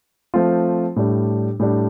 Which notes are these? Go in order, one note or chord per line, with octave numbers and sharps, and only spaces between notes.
F3 A3 C4 F4
A2 G3 D4
A2 G3 D4